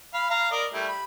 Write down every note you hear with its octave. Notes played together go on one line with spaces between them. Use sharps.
F5 B5
F5 A#5
A#4 D5 D#5
G3 A3 E4
B5